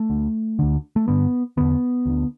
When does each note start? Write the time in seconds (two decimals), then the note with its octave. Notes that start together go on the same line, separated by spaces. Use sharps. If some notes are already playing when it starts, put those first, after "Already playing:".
Already playing: A3
0.10 D2 D3
0.59 D2 D3
0.96 A3
1.08 G2 D3 B3
1.57 E2 D3 B3
2.05 D2 D3